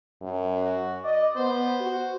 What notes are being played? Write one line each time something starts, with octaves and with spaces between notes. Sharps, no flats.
F#2
F#4
D5 D#5
B3 C5
F#4